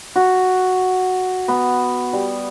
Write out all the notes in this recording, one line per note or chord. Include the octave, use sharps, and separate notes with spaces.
F#4
B3
G3